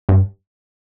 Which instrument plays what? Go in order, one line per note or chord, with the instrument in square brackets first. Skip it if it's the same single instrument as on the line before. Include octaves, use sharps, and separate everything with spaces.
[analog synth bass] G2